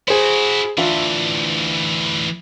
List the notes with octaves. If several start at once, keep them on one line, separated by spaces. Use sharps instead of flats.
E4 F#4 G#4 C5
D2 E3 D4 F4 E5